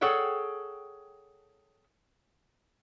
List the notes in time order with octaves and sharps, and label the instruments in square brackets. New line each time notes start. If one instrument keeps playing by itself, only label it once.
[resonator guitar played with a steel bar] G#4 A4 C#5 F#5 G5